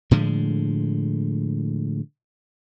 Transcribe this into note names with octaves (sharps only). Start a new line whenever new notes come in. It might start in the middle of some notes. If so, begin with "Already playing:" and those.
A2 D3 F3 G#3